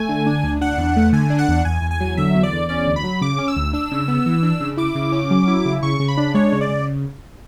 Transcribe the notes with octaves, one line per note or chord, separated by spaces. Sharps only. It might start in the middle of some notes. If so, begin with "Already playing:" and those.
Already playing: A3 G#5
D3
D4
D2
D4 F#5
E2
A3
D3 G#5
D4
F#5
E2
E2 G#5
E2
G#5
F#3
D3 E5
E2
D5
E2
C#4 D5
D2
B5
F#3
C#3 D6
C#4
E6
D2
D4 E6
C#3
B3
E3
D4
C#3
E4 D6
C#3
C#4
F#3
E4
C#3
C#3 C#6
C#3
B5
D4
G#3 C#5
C#3
D5
C#3